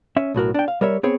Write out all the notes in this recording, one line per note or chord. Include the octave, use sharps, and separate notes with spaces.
C#4 E5
B1 A2 F#4 A#4
D4 G5
F5
G3 A#4 C#5 E5
B3 C4 G#4 C#5